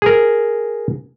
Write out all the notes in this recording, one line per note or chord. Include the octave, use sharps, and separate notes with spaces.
G#4 A#4